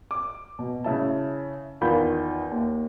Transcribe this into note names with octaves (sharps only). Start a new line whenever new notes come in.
D6
B2
C#3 E4 A5
E2 D#3 F4 B5 G6
D#2